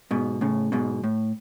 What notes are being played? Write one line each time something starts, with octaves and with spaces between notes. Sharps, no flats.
G#2 B2
A2 C#3
G#2 B2
A2